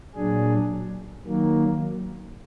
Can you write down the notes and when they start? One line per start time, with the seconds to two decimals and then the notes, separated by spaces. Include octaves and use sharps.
0.15 A#2 F#3 D4 G#4
1.26 D#3 F#3 A#3